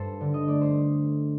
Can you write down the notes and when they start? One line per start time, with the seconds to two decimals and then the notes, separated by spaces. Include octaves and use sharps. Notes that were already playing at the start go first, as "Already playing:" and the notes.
Already playing: G2 A4 C5
0.21 D3
0.34 D#5
0.48 A3 D5
0.61 C5